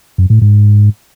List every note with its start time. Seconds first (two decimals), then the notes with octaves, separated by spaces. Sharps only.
0.18 F#2
0.30 A2
0.42 G#2